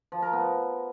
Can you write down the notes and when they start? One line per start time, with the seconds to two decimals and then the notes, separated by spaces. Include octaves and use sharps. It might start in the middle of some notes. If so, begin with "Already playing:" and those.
0.12 F3
0.22 A#4
0.33 B3